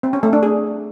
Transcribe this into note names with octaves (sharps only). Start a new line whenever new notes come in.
C4
C#4
A3
D4
G#4